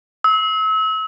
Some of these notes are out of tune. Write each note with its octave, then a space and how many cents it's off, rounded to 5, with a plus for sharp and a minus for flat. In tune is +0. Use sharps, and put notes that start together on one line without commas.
E6 -35